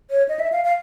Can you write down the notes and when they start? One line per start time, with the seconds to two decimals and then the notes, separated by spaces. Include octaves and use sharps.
0.10 C#5
0.29 D#5
0.39 E5
0.52 F5
0.64 F5